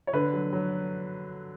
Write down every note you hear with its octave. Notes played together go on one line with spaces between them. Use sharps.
C#5
D3 B4
F#3
F#3